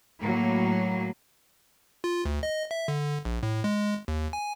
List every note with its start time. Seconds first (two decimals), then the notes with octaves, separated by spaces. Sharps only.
0.21 A2 F#3 A#3
2.04 F4
2.25 D2
2.43 D#5
2.71 E5
2.88 D3
3.25 A#1
3.43 A2
3.64 G#3
4.08 D#2
4.33 G#5